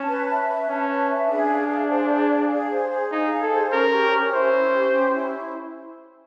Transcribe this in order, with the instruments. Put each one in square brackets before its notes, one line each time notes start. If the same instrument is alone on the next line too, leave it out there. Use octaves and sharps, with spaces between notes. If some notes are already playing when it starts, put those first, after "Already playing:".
Already playing: [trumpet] C#4 [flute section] A5
[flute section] B4
E5
B4
[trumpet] C#4 [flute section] A5
[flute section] B4
E5
[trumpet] D4 [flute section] G#4
[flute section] F5
G#4
C5
G#4
F5
G#4
C5
G#4
[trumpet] D#4 [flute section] F5
[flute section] G#4
[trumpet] A4
[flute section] C5
[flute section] C#4 [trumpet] A#4
[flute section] G4
C#4
[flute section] E4 [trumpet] C5
[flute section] C#4
G4
C#4
E4